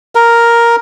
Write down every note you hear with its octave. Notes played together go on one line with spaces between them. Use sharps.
A#4